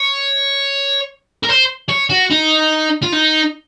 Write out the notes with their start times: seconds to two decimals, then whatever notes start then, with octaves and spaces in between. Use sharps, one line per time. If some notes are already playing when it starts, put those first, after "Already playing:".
Already playing: C#5
1.44 A#4
1.49 C5
1.89 C#5
2.10 F#4
2.31 D#4
3.03 F4
3.12 D#4